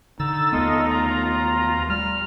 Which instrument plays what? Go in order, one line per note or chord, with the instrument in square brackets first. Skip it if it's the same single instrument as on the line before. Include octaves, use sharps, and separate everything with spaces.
[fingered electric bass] D3 [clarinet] D#4 [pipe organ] E6 A6
[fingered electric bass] D#2 A3 B3 [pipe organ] F4 A4 D#5
[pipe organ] F4 A#5
[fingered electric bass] G3 [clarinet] F6